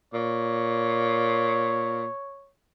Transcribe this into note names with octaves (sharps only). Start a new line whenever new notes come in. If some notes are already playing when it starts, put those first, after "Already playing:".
A#2 C#5